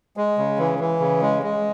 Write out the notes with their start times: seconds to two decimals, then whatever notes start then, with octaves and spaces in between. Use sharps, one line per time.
0.17 G#3
0.38 C#3
0.59 E3
0.79 E3
1.00 C#3
1.22 G#3
1.43 G#3